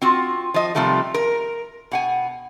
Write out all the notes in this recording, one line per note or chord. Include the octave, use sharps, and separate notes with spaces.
C4 F4 F#4
F3 D#5
C3 D#3 F3 G3 A3
A#4
B2 F#5 G#5